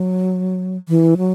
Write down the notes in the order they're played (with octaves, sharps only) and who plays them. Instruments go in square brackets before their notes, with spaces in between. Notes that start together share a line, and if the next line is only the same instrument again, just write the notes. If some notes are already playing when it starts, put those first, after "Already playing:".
Already playing: [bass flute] F#3
E3
F#3